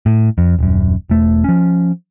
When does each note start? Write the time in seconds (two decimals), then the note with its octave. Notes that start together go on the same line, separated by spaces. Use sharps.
0.06 A2
0.38 F2
0.58 D#1 F#2
1.10 E1 E2 A3
1.44 F3 C#4